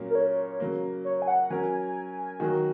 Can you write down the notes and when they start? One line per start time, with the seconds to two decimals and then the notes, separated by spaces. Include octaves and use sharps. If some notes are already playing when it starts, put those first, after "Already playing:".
Already playing: A#2 F#3 A#3 C#4
0.10 A#4
0.15 C#5
0.60 C#3 F#3 A#3
1.05 C#5
1.22 G#5
1.28 F#5
1.50 F#3 C#4 A#4 G#5
2.40 D#3 F#3 A#3 F#4